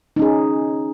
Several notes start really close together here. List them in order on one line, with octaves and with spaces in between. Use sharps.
D#4 C#4 G#4